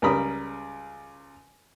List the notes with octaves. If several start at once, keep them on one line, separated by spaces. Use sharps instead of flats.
C#2 G3 A#4 B5 D#6